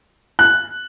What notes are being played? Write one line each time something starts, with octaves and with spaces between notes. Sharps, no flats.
F#6